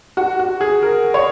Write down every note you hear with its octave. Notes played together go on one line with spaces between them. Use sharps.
F#4
F#4
G#4
A#4
C#5